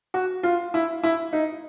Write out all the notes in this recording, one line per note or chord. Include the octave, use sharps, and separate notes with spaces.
F#4
F4
E4
E4
D#4